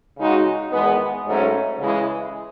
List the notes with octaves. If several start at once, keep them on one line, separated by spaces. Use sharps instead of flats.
C#3 G#3 D#4 F#4
E2 D#3 G#3 B3
G#2 F#3 A3 C#4
C#3 E3 G#3